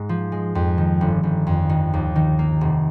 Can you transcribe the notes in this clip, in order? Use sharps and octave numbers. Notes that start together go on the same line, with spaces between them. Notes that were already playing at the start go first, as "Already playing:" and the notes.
Already playing: G#2 G#3
F3
G#3
F2
D#3
G1
G1
F2
D#3
D#2
D#3
A#3
F1